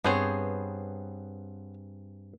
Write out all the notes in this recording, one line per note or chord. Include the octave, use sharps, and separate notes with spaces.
G2 B3 C4 G#4 C5 C#5